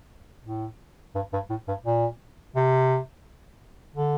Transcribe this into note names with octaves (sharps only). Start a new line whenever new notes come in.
A2
G2
G2
A2
G2
A#2
C3
D3